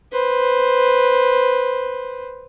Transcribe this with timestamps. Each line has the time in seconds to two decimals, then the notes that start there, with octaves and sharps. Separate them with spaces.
0.12 B4 C5